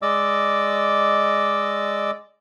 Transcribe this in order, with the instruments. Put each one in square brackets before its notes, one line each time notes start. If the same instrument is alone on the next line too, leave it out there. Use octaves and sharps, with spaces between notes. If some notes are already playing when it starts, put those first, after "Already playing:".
[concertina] G#3 D5 D#5 D6 E6